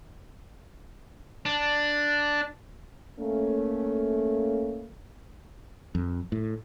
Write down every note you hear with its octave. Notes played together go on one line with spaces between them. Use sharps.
D4
A3 A#3 C#4
F2
A2